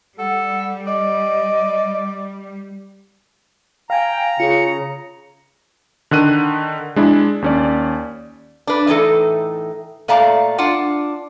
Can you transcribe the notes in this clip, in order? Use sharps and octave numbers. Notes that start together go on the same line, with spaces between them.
G3 A4 F#5
D5 D#5
F5 G5 G#5 A#5
C#3 F4 C#7
D3 D#3 F#6 D#7
G#3 D4 E4
D#2 C#4 D5
D4 B4
A2 E3 D#4 A4
A#2 A3 D5 F5 A5 A#5
D4 F4 F#5